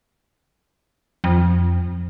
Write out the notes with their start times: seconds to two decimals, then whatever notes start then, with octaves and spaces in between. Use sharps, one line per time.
1.24 F2